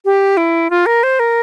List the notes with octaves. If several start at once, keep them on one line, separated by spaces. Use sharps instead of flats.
G4
E4
F4
A#4
C5
A#4